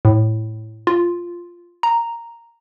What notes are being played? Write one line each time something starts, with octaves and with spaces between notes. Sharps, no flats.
A2
F4
A#5